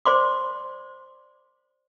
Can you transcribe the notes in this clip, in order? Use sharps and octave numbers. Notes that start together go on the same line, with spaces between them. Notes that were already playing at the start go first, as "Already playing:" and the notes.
C5 D5 C6 D6